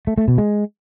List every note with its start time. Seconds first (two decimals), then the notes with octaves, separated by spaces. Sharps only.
0.07 A3
0.18 A3
0.28 B2
0.38 G#3